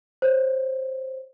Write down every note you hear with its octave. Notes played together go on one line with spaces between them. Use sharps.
C5 C#5